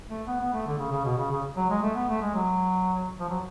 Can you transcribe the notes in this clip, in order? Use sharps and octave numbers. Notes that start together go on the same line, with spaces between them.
A3
B3
B3
A3
D3
C#3
C#3
B2
C#3
C#3
F#3
G#3
A3
B3
A3
G#3
F#3
F3
F#3